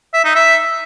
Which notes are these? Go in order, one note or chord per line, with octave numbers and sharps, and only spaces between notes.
E5
D#4
E5